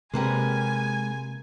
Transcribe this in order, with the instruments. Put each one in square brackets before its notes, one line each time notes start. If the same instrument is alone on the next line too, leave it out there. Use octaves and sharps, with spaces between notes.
[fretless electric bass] C3 [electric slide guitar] G#3 G4 [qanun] A#3 A#4 B4 [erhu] G#5